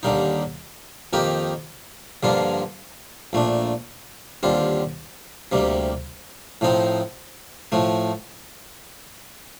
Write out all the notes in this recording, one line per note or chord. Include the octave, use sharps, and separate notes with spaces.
D#2 D3 G3 A#3 D#4
F2 D#3 A#3 D#4 G4
G2 D3 F3 A#3 F4
A#1 A#2 A3 D4
D#2 D3 G3 C4 F4
D2 C3 G3 A#3
A2 F3 C4 D#4
A2 F3 A3